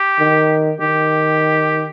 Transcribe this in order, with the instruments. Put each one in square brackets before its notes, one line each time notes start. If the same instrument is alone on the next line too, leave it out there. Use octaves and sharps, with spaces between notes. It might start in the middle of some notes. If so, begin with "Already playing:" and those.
Already playing: [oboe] G4
[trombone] D#3
[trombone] D#3 [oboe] G4